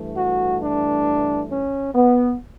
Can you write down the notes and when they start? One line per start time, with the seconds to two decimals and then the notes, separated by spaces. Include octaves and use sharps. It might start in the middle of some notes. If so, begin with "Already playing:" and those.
Already playing: G2 E3 A3
0.15 F#4
0.60 D4
1.50 C#4
1.94 B3